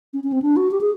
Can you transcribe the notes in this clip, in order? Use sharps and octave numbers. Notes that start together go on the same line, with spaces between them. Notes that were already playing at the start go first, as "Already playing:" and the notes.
C#4
C#4
C4
D4
F#4
G4
G#4